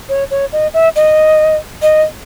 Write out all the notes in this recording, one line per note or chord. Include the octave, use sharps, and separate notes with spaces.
C#5
C#5
D#5
E5
D#5
D#5